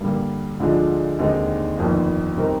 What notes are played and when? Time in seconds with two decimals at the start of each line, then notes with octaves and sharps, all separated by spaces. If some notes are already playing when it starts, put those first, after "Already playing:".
0.01 G2 D3 G3 A#3
0.60 D2 D3 F3 G#3 D4
1.19 D#2 D3 G#3 C4 D#4
1.78 G1 F2 D#3 A#3
2.36 C3 G3 C4 D#4 A#4